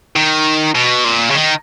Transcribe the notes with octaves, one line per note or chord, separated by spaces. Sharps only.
D#3
B2
A#2
C#3
D#3